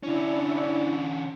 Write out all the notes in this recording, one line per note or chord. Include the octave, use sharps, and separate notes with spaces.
D3 C#4 D4 E4